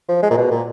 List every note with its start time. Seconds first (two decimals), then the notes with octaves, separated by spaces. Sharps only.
0.09 F3
0.22 G#3
0.31 A#2
0.37 B2
0.51 A#2